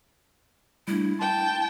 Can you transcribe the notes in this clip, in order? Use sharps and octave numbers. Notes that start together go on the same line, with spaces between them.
G3 A3 D4 E4
G5 A5 C6